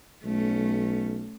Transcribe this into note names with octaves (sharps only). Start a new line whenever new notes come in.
B1 A3 C#4